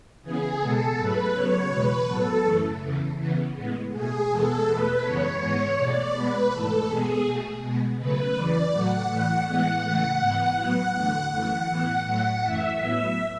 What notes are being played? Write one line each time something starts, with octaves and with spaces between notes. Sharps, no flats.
C#3 E3 B3 G#4
B2 G#3 B3 A4
G#2 F#3 A3 B4
C#3 F#3 B3 C#5
E2 B2 G#3 B4
A2 F#3 B3 A4
F#2 C#3 E3 A3
E2 C#3 E3
C#3 E3 B3
A2 G#3 B3
B2 A3 G#4
E2 B2 G#3 B3 A4
E2 B2 A3 B4
F#2 C#3 E3 G#3 B3 C#5
G#2 E3 G#3 B3 C#5
B2 A3 D5
B2 G#3 B3 B4
G#2 E3 A3 A4
B2 G#3 B3 G#4
B2 A3
B2 G#3 B3
C#3 F#3 A3 B4
E2 C#3 E3 D5
A2 F#3 A3 F#5
A2 E3 A3 F#5
A2 E3 G#3 B3 F#5
C#3 E3 A3
G#2 E3 B3
A2 F#3 B3 F#5
E2 D3 A3
F#2 E3 A3 F#5
A2 E3 B3
A2 F#3 A3 F#5
F#2 E3 A3 E5
A2 F#3 B3 E5